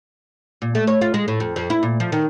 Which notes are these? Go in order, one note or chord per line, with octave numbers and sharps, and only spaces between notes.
A#2
A3
C#5
F4
G#3
A2
F2
F2
E4
A#2
F3
D#3